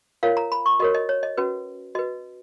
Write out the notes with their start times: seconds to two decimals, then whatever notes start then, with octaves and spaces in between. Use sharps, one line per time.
0.23 F4 A#4 C#5 F5
0.37 A#5
0.52 B5
0.66 C#6
0.80 F#4 A#4 C#5 D#5
0.95 D#5
1.09 C#5
1.23 D#5
1.37 C#4 F#4 B4
1.95 F#4 B4 D#5